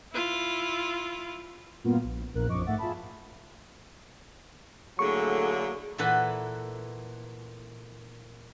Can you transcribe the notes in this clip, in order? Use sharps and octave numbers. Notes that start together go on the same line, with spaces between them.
E4 F4
G2 A#2 A#3 B3 F4 F#4
A#1
A#1 E2 A#2 A#4 F#6
B1 F#2 F3 D#5 C#6 D6
G#2 A3 D5 E5 F#5 A6
F4 G#4 E5 A5 B5
A2 D3 F#3 A3 A#3 G#4 C#6
A#2 E3 A4 B4 F#5